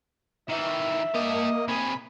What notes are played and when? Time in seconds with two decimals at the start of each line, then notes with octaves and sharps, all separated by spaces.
0.49 D#3 E3 E5
1.15 A#3 G4 D#5 A5
1.68 C3 G#4 B5